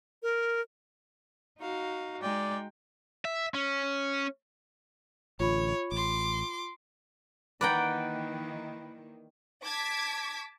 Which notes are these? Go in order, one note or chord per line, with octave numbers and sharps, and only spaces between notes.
A#4
D#4 F#4 F5
G#3 D#4 D5 G5
E5
C#4
A1 D3 F4 C#5 B5
A1 C6 D6
D#3 E3 A#3 B4 D5 F#5 G5 A#5
A5 D6 G#6 B6